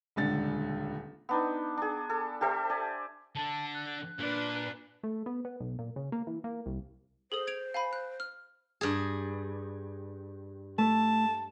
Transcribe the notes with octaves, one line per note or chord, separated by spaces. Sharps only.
D#1 C#2 D3 A6
B3 D4 D#4
D4 G#4
A4
G4 A4 C5 E5
D5 G#5
D3 D4 A5
F#6
A#2 D4 B4
A3
B3
B3
B1
A#2
C#3
A#3
E3
A#3
C2
G#4 A4 C5 D#6
G#6 D7 F7
F5 G#5 B5
F#6
F6
G2 G#4
A3 A5